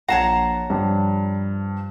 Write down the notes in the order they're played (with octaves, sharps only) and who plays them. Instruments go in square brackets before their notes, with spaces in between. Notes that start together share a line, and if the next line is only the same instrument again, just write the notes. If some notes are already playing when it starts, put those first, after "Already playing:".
[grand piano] A#1 F#5 C7 [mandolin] C#5 A5 A#5
[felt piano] G2 [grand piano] F3